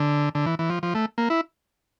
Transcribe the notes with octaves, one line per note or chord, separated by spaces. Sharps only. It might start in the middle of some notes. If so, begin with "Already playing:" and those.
Already playing: D3
D3
E3
E3
F3
F3
A3
A#3
E4